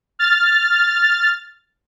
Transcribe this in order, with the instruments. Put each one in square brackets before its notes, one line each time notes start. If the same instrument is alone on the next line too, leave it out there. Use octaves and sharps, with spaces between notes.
[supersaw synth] F6 A6